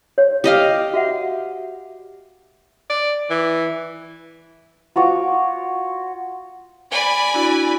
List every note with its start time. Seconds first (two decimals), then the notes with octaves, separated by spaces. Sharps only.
0.18 C#5
0.44 G4 D#5 F5
0.94 F#4 E5 F#5
2.90 D5
3.30 E3
4.96 F4 F#4 C#5 D6
6.92 D5 G#5 B5
7.34 D4 E4 F#4